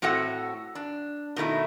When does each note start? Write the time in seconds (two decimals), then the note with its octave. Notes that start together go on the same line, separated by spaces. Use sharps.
0.02 A2 C4 F#4 A4 F#5
0.75 D4
1.36 B2 D#3 A3 E4